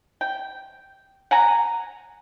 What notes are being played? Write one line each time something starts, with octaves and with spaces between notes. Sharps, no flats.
G5
F#5 G#5 A#5